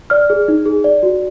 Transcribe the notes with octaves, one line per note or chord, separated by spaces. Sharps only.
D5 F6
G#4
D#4
G#4
D5
F#4